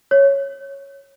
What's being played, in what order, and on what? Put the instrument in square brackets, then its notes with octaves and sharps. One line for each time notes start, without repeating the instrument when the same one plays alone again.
[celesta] C#5